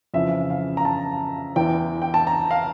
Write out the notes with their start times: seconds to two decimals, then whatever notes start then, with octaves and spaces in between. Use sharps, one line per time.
0.14 F2 C#3 E3 E5
0.50 F5
0.77 A#5
0.85 A5
1.56 E2 E3 G5
2.02 G5
2.14 A5
2.27 A#5
2.51 F5